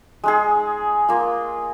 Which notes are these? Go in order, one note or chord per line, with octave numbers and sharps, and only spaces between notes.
G#3 D#4 G#4
A#3 F4